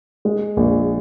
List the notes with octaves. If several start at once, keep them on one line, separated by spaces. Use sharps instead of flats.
G#3
A#1